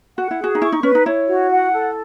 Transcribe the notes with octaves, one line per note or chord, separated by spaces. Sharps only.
F#4 F#5
E4
F#4 G#4
D#4
E4 C#6
D#4
C#4 B4
D#4
E4 C#5
F#4
F#5
A4